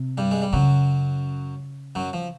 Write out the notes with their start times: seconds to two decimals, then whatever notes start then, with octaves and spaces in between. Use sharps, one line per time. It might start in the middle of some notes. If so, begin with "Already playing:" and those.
Already playing: C3
0.18 G2 G3
0.31 G#3
0.42 G3
0.53 F#2 C#3 F#3
1.95 F#2 F#3
2.13 F3